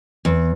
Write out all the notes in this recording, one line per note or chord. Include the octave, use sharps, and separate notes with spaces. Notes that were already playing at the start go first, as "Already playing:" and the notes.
E2